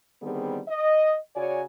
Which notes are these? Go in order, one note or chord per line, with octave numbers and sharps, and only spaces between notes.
D3 D#3 G3 B3 C4 G#4
D#5
C#3 F#4 C#5 D5 G#5